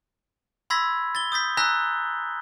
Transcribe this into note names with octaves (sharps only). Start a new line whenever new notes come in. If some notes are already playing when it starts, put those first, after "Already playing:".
B5 C6 E6 G#6 A#6 B6
A6 G7
D#6 G6 A6 B6
G#5 A#5 E6 F#6 A#6 B6